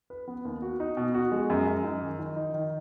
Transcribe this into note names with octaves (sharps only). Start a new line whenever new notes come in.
B4
B3
D#2
F#4
D#4
B2
F#4
G#3
F#2
F#2
D#4
D#3
D#3
D#4
D#3